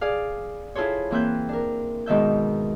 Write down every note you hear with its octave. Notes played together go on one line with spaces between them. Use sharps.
G#4 D5 F5
E4 F4 G#4 A4 C5 C#5
E3 A#3 C4 E5 F#6 G6
D4 A#4
G#2 B2 D#3 E5 G6